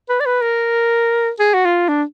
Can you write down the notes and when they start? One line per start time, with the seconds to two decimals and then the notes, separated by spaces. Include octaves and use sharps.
0.09 B4
0.20 D5
0.26 B4
0.42 A#4
1.40 G#4
1.54 F#4
1.65 F4
1.89 D4